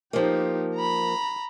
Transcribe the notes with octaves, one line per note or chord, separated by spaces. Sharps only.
F3 A#3 D#4 G4
A#5 B5